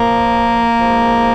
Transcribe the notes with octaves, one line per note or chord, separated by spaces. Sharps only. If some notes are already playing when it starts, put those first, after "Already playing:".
Already playing: A#2 F3 A#3
G#2 F3